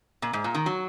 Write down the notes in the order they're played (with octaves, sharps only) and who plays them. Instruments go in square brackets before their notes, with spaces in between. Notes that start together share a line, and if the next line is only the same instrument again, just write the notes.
[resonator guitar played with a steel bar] A#2
G#2
A#2
D#3
F#3